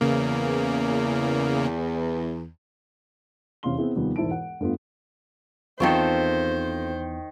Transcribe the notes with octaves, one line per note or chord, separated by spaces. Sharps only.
E2 C#3 A#3
E2 C3 C#4 F5 C6 G7
B3 C4 E4 G#4
D#2 C3 F3 G3 B3
E1 G#2 E4 C5 A5 D7
F#5
G2 A3 B3 F4
E2 D#3 C4 F4 A4 C5 C#6